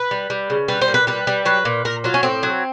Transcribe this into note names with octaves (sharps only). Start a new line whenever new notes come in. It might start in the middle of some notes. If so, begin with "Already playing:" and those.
Already playing: B4
G3
G3
C#3
G3 B4
C5
A#2
B4
G3 B4
G3
F#3 B4
A#2
A#2 A#4
F#3 F4
C#4
A2 C4
F#3